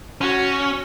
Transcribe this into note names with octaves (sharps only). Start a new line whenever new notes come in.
C#4 F#4